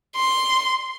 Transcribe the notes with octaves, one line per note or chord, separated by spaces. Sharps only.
C6